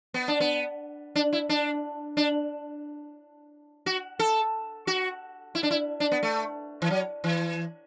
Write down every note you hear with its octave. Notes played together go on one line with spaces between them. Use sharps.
B3
D4
B3
D4
E4
D4
D4
F#4
A4
F#4
E4
D4
E4
D4
B3
A3
E3
F#3
E3